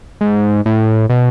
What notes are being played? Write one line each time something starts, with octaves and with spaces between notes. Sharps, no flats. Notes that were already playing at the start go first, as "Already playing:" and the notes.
G#2
A2
B2